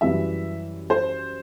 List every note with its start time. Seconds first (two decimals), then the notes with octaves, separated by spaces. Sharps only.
0.01 F#2 E3 G3 E5
0.90 C5